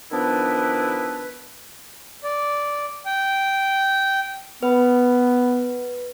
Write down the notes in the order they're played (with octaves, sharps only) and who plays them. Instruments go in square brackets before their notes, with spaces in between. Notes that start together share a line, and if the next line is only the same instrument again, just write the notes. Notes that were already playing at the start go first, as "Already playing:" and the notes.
[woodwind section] D#3 F3 B3 D4 E4 B4
[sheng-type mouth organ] D5
G5
[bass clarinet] B3 [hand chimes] B4